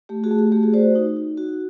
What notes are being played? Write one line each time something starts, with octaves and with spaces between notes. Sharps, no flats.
A3 G4
F#4 G#4
A3
G4
A3 G4
F#4 G#4
F#4 C5 D5
D#4
D#4
F#4